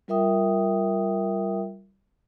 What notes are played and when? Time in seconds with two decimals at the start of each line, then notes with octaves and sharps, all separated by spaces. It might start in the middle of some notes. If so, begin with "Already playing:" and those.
0.08 G3 F4 A#4 E5 G5 D#6